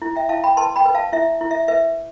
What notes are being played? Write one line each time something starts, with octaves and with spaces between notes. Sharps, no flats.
E4
E5 G5
E4 F5 A5
G5 B5
B4 A5 C6
G5 B5
B4
F5 A5
E4 E5
E4
E5
B4 E5